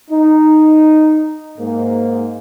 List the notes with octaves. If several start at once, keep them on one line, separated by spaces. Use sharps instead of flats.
D#4
G#2 A#3